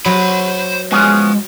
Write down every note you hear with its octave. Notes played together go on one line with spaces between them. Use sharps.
F#3 C5 B5
F3 G#3 B3 C#4